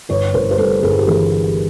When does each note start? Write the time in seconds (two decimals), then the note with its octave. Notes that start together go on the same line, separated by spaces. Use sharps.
0.09 G1 B4 C#5
0.34 G1 A#4 C5
0.51 C5
0.58 G2 A4 B4
0.83 G1 G#4 A#4
0.99 G4
1.07 E3 G#4